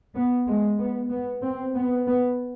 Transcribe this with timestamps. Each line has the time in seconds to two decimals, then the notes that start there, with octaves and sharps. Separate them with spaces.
0.16 B3
0.47 G#3
0.79 B3
1.10 B3
1.42 C4
1.75 B3
2.07 B3